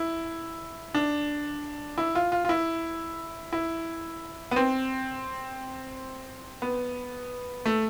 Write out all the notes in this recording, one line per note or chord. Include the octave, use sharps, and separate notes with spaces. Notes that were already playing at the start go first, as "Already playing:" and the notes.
Already playing: E4
D4
E4
F4
F4
F4
E4
E4
B3
C4
B3
A3